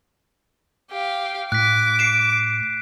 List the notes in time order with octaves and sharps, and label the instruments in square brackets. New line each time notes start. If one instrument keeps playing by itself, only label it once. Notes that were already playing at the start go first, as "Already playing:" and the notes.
[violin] G4 F5
[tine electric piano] A2 [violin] D6 [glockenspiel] F#6 B6
[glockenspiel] C7 D7 E7